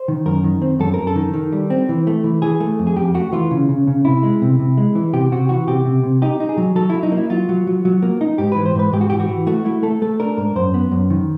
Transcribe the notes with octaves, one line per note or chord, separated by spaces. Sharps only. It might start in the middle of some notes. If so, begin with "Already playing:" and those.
Already playing: C5
D#3
F#2 A#4
D#3
C4
F#2 A4
F#2 A#4
A4
D#3
D#3
G3
C4
E3
A3
E3
E3 G#4
A3
F2
G#4
F2 G4
A3 F#4
E3 F4
C#3
C#3
C#3
C3 E4
G#3
C3
C3
G#3
E3
C3 G4
C3 F#4
E3 F#4
C3 G4
C3
C3
D#4 G4
D#4
G#4
F#3
F#3 A4
F#3 E4
D#4
A#3
E4
F#3 F4
F#3
F#3
F#3
A#3
D#4
G#2 G4
E3 B4
C5
G#2 B4
G#2 G4
F#4
E3 G4
F#4
E3
A3 F#4
A3 E4
A3 A4
A3 A4
D4 A#4
G#2 A#4
F#2 C5
B3
F#2
D#3